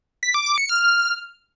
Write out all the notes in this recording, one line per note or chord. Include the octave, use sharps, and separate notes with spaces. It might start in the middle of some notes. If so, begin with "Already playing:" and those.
B6
D6
D6
C#7
F6